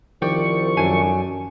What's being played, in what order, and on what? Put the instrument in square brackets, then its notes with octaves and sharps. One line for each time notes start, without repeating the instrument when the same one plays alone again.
[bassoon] C2 [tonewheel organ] D#3 F3 C#6 [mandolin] D5 G5
[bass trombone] F#2 [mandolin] A3 D4 G#5